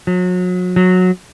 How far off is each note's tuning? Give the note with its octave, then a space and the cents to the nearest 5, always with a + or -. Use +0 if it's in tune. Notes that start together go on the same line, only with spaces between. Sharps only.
F#3 -35
F#3 -15